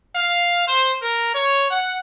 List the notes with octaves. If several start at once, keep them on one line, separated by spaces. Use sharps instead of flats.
F5
C5
A#4
C#5
F#5